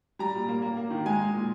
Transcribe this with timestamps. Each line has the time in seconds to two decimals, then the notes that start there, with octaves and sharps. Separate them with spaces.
0.19 G3 A#5
0.35 A#2
0.48 A#3
0.62 A#3
0.77 A#3
0.90 D#3
1.06 G#3 G#5
1.19 G#3
1.34 A#2